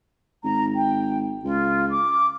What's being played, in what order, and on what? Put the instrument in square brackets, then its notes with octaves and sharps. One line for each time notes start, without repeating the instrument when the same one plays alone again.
[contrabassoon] G#1 [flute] A#5
[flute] G5
[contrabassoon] C#2 [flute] F4
[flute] D6